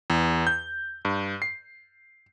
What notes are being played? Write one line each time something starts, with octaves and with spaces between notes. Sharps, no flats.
E2
G6
G2
C7